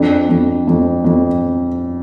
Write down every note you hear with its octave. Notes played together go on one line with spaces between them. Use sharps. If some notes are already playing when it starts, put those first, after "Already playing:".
Already playing: F2 D4
F2
F2
F2